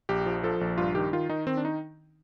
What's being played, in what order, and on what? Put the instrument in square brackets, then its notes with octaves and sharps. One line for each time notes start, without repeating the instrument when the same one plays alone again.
[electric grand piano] A#1 G4
F3
F3 A4
A#1
G2 F4
D#3 G4
D#3 F4
D#3 D#4
D#3 C4
D4
D#4